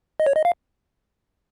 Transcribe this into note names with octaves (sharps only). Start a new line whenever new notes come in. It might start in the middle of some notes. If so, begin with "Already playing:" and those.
D#5
C#5
D#5
F5